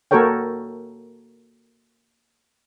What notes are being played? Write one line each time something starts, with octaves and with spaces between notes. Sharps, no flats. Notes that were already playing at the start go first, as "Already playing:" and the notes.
A#3 F#4 A4 A#4 C#5 G5